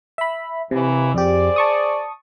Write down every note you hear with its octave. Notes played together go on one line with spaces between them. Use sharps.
E5 B5
D#2 C3 E3
F2 G4 G#4 C5 D5
A5 C#6 D#6